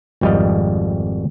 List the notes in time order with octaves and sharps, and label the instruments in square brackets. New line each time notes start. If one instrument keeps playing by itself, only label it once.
[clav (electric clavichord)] G#1 F2 G3 D#5 F5